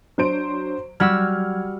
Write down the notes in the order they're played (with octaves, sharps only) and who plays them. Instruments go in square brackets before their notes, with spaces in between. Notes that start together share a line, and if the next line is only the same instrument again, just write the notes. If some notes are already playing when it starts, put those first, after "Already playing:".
[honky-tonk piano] F#3 C5 D7 [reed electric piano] D4
[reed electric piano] F#3 G#6 [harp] G3 F#4 E6 [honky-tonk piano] F6